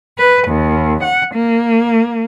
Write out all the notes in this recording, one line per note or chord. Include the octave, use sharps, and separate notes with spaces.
B4
D#2
F#5
A#3